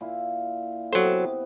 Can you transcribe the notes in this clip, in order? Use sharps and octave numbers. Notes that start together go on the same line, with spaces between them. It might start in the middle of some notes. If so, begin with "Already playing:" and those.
A#2 E4 F5
C3 F#3 B3 A4 C5